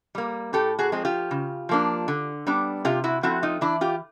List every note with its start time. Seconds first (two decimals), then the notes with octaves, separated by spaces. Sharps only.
0.15 G3 A#3
0.53 A2 G4 A4
0.79 F#4 G#4
0.92 F3 G#3 C4
1.05 F4 G4
1.31 C#3
1.69 F3 A#3 D4
2.08 D3
2.47 G3 B3 D4
2.85 C3 F4 G4
3.04 E4 F#4
3.23 F3 A3 C4 E4 F#4
3.43 D#4 F4
3.61 E3 D4 E4
3.81 F4 G4